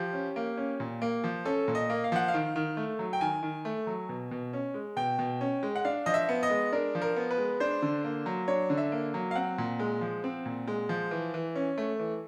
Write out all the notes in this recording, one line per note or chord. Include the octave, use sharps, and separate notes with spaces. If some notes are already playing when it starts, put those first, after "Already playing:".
Already playing: F3 G4
C#4
A#3
C#4
A#2
A#3
F3
C#4 A4
A#2
D#5
A#3
F5
F3 F#5
F5
D#3
D#3
A3
F#3
G5
D#3 G#5
D#3
A3
F#3
B2
B2
C#4
G#3
B2 G5
B2
C#4
G#3
F#5
D4 F5
F3 D#5
E5
B3
D#5
G#3
D4 A#4
F3
A#4
B3
B4
G#3
D4 C5
D3
A#3
F#3
D4 C#5
D3
E5
A#3
F#3
F5
C4 F#5
A#2
G#3
F3
C4
A#2
G#3
F3
E3
E3
C#4
A3
E3